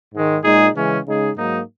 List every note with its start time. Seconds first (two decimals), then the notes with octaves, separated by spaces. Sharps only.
0.13 G#2 D#3 G#3
0.44 A#2 G#3 D#4 G#4
0.75 C#3 E3 G#3 C#4
1.06 C#3 G#3 D#4 G#4
1.36 G#2 F#3 A#3 D#4